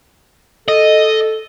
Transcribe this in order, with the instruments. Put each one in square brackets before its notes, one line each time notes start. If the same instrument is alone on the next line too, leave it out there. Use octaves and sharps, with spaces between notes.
[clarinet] A4 [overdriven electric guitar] D#5